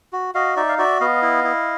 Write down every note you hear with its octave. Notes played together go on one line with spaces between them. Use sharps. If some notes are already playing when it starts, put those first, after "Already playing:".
F#4
F#4 D#5 F5
D#4 D5 E5
F5
F#4 D5 E5
B3 D#5 F5
E4
E4